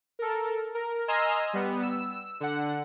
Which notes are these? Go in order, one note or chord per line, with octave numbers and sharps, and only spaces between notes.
A4 A#4
A#4
D#5 G#5 A#5 C6 E6 F6
G3 B3
E6
D3 F#5